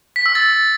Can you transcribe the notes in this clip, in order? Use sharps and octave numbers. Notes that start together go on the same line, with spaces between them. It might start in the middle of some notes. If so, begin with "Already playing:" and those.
B6
E6
A6